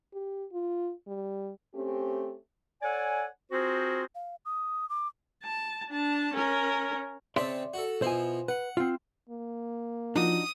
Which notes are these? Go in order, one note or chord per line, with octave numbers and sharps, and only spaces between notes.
G4
F4
G3
A3 C4 C#4 G4
A4 C#5 D5 F#5 G#5
C4 F4 F#4 G#4 A#4 C5
F5
D#6
D6
A5
D4 A5
C#4 A#4
C#3 C4 D5 E5 A5 C6
F#4 A4
B2 F3 E4 C5 G#5
B4 F#5
C4 F4
A#3
F3 D4 D#4 F#4 D#6